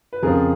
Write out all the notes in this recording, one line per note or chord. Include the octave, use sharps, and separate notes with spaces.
B4
F2 C#3 F3 G#4 A#4